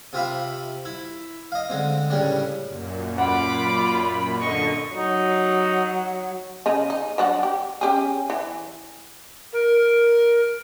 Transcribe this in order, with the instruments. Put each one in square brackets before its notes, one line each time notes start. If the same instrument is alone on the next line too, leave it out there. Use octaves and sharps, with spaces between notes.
[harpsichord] C3 F4 G4 E5 F5 B5
E4
D#5 F5
D3 G#3 C4
A2 C#3 G3 D4
[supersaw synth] F#2 A#2
[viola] F4 B5 [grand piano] F#5 [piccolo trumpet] D6
[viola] D3 D#5 [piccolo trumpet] C#6
[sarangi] F#3 [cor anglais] D#4
[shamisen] C#3 G#4 D#5
D#4
F#3 D4 F#4
G4
C#4 G4 G#4
E3
[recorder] A#4